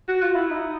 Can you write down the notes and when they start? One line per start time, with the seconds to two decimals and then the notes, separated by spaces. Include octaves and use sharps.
0.08 F#4
0.22 F4
0.35 E4
0.51 D#4